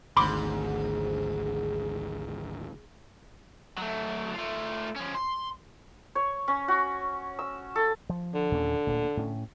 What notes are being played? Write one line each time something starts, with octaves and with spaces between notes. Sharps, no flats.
G#1 D2 G#2 B5 C6 D6
F#3 A3
A3 F4
F3 C#4
C6
C#5
C#4
F#4
E6
A4
F3
D3
D#2 A#2 C#4
D1 A#2
A2 C#4